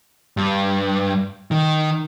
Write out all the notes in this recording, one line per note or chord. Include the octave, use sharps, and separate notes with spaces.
G2
D#3